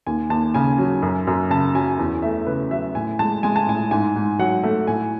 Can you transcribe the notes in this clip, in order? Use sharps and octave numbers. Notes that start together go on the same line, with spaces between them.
D#2 G#5
D#2 A5
C#3 G#5
F#3
F#2
F#2
C#3 A5
F#3 G#5
E2
A3 E5
C#3 B4
F#3 E5
A2 G#5
G#3 A5
G#3 G#5
A5
A2 G#5
G#2 G#5
G#2
F#3 F#5
A3
A2 G#5